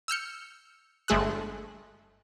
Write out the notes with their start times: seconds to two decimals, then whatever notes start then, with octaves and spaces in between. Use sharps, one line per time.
0.08 E6 F6 G6 C#7
1.08 G1 G#3 A3 G#4 E6 F#6